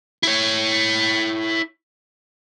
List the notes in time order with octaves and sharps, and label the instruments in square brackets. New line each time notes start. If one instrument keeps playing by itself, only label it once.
[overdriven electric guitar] E4 C#5